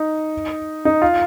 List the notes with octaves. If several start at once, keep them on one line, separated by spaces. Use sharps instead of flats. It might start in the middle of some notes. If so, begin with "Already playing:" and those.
Already playing: D#4
D#4
F4